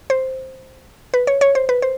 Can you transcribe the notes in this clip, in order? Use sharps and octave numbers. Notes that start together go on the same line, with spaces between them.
C5
B4
C#5
C#5
C5
B4
C5